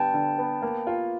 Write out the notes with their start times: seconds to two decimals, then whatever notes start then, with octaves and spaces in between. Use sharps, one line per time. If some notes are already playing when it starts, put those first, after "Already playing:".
Already playing: D3 G3 B3 G5 A5
0.14 D3
0.38 B3
0.62 A#3
0.87 F4